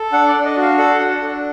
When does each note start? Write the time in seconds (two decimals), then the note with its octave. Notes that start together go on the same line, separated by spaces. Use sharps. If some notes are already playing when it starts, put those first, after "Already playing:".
Already playing: A4
0.13 D4 F#5
0.28 D5
0.34 D4
0.45 D#5
0.57 F#4 F5
0.78 A4 F#5
0.99 D4
1.22 D4